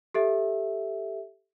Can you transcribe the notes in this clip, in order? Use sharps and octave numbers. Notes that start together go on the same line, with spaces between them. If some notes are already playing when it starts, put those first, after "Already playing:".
G4 A4 E5